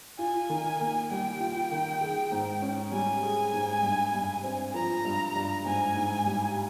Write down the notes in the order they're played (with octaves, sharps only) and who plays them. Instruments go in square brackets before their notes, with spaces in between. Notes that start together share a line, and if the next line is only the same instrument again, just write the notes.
[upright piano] F4 [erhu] G#5
[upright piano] D#3
A#3
[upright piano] G3 [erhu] G5
[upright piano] F4
D#3
G#4
G#2
C#4
[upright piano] G3 [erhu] G#5
[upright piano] G#4
G#2
G2
G2
C4
[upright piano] F3 [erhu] A#5
[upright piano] G2
G2
[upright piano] G#2 [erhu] G#5
[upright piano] G#2
G3